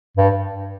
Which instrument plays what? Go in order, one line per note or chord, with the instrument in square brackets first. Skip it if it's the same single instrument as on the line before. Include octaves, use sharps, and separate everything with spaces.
[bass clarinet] G2